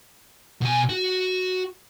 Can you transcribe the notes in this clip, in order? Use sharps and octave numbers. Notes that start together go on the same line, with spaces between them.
B2 G#5
F#4